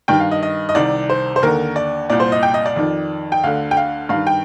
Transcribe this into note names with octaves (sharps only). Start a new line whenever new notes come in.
G2 D#3 G5
F5
D#5
D#5
D#5
C2 C3 D#3 D5
C5
C5
D#2 D3 A#4
D5
C2 A#2 D5
C5
D#5
G5
D#5
D5
F2 D#3
G5
D2 D3 F5
G5
F5
G2 D#3 F5
G5